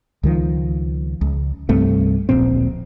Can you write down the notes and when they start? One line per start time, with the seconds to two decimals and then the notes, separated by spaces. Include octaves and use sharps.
0.23 C#2 D#3 F3
1.21 C#2
1.69 C2 G2 A3 C4
2.29 D1 A#1 A#2 C4